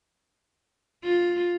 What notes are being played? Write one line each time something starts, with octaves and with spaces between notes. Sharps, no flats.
F4